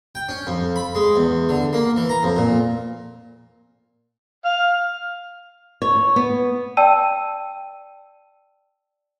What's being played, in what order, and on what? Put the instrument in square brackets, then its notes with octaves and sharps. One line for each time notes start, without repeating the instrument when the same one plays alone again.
[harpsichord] G5
C#4
F2
B5
G#3
E2
D3
A#3
E3
A#5
F2
A#2
[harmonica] F5
[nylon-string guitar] C#5
B3
[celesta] D5 G5 A5 E6 D#7